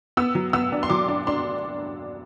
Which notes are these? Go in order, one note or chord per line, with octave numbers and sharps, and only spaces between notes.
B3 E6
F#3
B3 E6
D4
C6
F#3 D6
D4
D4 C6